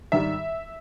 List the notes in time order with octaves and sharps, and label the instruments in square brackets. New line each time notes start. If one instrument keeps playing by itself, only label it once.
[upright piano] G#2 D#3 G3 E5